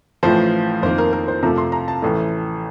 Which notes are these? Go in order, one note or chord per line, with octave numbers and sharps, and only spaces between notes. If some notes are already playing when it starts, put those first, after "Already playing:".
A1 A2 F3 C5
F2 D#3 A#3 C5
A#4
A#4
C5
F2 C3 F3 A3 A#5
C6
A#5
A5
A1 A2 A3